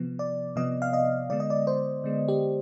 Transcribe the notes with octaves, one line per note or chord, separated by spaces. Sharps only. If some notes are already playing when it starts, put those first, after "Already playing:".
Already playing: C3 F3 B3
D5
C3 F3 B3 D#5
F5
D#5
D3 G#3 B3 D5
D#5
D5
C5
D3 G#3 B3
G4